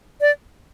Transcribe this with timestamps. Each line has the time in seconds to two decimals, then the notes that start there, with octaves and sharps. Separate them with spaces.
0.21 D5